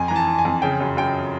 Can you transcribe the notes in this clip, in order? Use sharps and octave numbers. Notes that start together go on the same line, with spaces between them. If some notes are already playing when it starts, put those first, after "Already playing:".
Already playing: F2 G#5
E3 A#5
A5
E3
G#5
F2
C#3 G5
F#2
F#2 G5